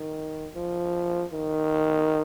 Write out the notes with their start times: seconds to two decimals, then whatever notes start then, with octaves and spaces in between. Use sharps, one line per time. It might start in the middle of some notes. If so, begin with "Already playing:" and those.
Already playing: D#3
0.56 F3
1.33 D#3